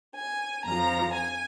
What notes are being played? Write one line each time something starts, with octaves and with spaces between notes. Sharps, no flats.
G#5
F2 F3 A#5
G#5